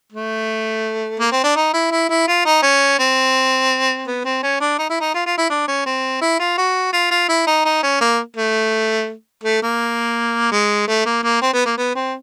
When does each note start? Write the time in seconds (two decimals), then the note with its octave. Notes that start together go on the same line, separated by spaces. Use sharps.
0.12 A3
1.20 A#3
1.32 C4
1.44 D4
1.56 D#4
1.73 E4
1.92 E4
2.10 E4
2.28 F4
2.45 D#4
2.62 C#4
2.99 C4
4.07 B3
4.25 C4
4.43 C#4
4.60 D4
4.78 D#4
4.90 E4
5.00 D#4
5.14 F4
5.26 F4
5.38 E4
5.50 D4
5.68 C#4
5.86 C4
6.21 E4
6.39 F4
6.57 F#4
6.93 F4
7.11 F4
7.29 E4
7.47 D#4
7.65 D#4
7.83 C#4
8.01 A#3
8.37 A3
9.44 A3
9.62 A#3
10.52 G#3
10.88 A3
11.06 A#3
11.23 A#3
11.42 C4
11.53 B3
11.65 A#3
11.77 B3
11.95 C4